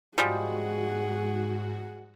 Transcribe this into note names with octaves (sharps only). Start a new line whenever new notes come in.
G#2 F3 G3 G#3 F#4 G#4 F#5